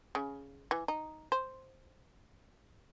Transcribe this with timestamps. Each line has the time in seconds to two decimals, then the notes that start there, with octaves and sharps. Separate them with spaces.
0.15 C#3
0.71 E3
0.88 D#4
1.32 C5